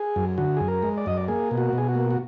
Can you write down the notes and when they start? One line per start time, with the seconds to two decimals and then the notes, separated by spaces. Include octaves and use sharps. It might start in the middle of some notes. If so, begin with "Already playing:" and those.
Already playing: G#4
0.16 F#2
0.38 D3 F#4
0.57 F#2 G#4
0.68 A#4
0.82 G#3
0.98 D5
1.06 F#2 D#5
1.17 D5
1.28 A#3 G#4
1.51 B2
1.58 F#4
1.73 B2 G#4
1.88 F#4
1.95 A#3
2.11 F#4